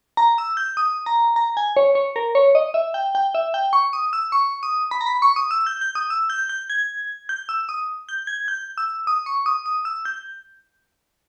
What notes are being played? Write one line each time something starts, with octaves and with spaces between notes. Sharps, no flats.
A#5
E6
G6
D#6
A#5
A#5
G#5
C#5
C#5
A#4
C#5
D#5
E5
G5
G5
E5
G5
C#6
D#6
E6
C#6
D#6
B5
A#5
B5
C#6
D#6
E6
G6
G6
D#6
E6
G6
G6
G#6
G6
E6
D#6
G6
G#6
G6
E6
D#6
C#6
D#6
D#6
E6
G6